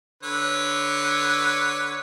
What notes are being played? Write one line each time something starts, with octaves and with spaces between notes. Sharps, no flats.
D3 B4 C#5